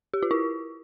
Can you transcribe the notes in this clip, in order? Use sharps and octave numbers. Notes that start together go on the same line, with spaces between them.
G4
F4
E4